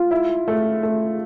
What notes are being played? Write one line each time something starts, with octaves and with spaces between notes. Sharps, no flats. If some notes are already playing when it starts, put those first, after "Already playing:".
Already playing: F4
E4
A3
A3